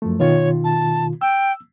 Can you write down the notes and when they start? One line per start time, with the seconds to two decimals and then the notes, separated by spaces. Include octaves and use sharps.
0.02 F#2 F3 A3
0.20 B2 D#3 F4 C#5
0.64 A5
1.21 G5 E6